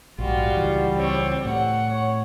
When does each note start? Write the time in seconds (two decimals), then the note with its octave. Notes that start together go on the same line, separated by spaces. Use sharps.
0.18 A#1 G#2 G3 F4 F#4
0.55 C#2 E3
0.96 C4 C#5
1.45 A2 F#5
1.90 C#5